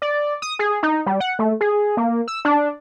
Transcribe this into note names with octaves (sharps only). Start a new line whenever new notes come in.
D5
D#6
G#4
D#4
G3
F#5
A3
G#4
A#3
E6
D4